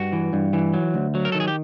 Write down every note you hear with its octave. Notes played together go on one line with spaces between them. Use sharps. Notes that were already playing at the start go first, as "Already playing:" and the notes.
Already playing: G2 F#4
E3
G2
E3
F#3
D2
F#3
A#4
A4
D#3
G#4
G4